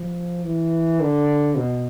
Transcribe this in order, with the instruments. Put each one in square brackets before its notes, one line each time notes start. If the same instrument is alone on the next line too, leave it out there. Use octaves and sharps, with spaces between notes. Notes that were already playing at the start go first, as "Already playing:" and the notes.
Already playing: [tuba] F3
E3
D3
B2